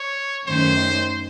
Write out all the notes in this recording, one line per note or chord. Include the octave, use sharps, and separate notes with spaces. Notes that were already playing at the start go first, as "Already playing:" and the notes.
Already playing: C#5
F#2 D#3 A3 C#4 C5